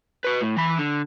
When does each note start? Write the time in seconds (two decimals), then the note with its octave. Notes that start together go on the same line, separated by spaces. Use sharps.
0.24 F#4 B4
0.41 A2
0.57 E3 B5
0.78 D3